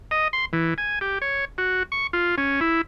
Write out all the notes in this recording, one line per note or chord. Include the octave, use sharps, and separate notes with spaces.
D#5
C6
E3
G#5
G4
C#5
F#4
C#6
F4
C#4
E4